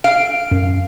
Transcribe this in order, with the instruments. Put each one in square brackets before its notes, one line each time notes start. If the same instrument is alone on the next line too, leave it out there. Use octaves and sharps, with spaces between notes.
[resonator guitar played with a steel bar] F5 [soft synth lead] D7
[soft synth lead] F#2